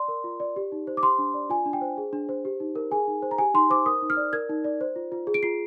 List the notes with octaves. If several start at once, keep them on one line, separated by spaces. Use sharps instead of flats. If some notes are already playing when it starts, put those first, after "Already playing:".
Already playing: D5 C6
A#4
F4
D5
G4
D#4
C5
D6
G4 C6
D4
D5
F4 G#5
D4
G5
C5
G#4
D4
C5
G4
D#4
A#4
G#4 G#5
D#4
C5
A#5
G4 G#5
D#4 C6
C5 D6
A#4 D#6
D#4
F6
D5
A#4 G#6
D#4
D5
C5
F4
F4
G#4
D7
F4 C7